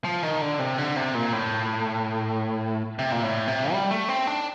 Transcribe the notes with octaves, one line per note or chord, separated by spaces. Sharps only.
F3
D#3
D3
C3
D3
C3
A#2
A2
C3
A#2
A2
C3
G3
A3
C4
D4